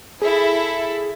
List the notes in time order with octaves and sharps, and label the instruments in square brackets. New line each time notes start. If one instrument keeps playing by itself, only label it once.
[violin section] E4 A4 E5 [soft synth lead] G#4